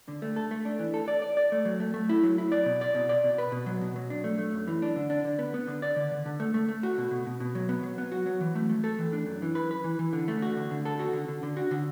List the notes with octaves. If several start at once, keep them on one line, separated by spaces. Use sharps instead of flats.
D3
A3
A4
A3
D4
E3
A4
D5
D5
D5
A3
F#3
A3
A3
E4
F#3
E4
D5
B2
D5
B2
D5
B2
B4
B2
F#3
B2
F#3
D4
A3
A3
F#2
E3
D4
D3
D4
D3
B3
B3
D3
D5
D3
D3
D3
A3
A3
A3
F#4
B2
B2
B2
B2
F#3
B3
F#3
B3
F#4
F#3
E3
A3
A3
A4
E3
D4
F#2
E3
B4
B4
E3
E3
D3
A3
F#4
D3
D3
A4
F#4
D3
D3
D3
F#4
D3